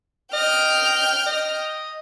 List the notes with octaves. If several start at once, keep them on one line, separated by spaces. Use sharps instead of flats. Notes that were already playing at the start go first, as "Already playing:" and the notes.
D#5 G5 F6
D#5